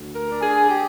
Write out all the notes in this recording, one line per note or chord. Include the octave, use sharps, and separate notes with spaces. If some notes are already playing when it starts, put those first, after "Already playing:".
Already playing: D2
A#4
D4
G#4
G4